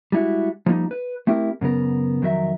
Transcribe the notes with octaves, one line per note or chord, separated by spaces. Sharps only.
G3 G#3 E4 F#4
F3 G3 A#3 C#4 D#4
B4
A3 C4 E4 G4 G#4 A#4
F#2 C#3 B3 A#4
F2 D#3 F#3 A#4 E5